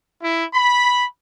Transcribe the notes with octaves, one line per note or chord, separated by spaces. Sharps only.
E4
B5